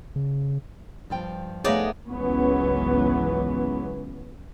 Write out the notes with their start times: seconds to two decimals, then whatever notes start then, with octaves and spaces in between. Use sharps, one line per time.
0.16 C#3
1.10 G2 F3 G5
1.64 A3 B3 D#4 G#4 C#5 D5 E5 F5
2.09 G#1 C#2 E3 F#3 B3 C#4